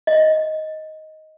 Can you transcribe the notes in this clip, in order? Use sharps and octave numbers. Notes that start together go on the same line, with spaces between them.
D#5